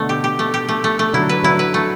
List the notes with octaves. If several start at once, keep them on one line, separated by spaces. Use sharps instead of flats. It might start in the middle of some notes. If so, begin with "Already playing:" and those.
Already playing: B2 D3 A3
G4
G4
A3
G4
A3
A3
A3
D3 F#3 E4
B4
D3 F#3 E4
B4
A3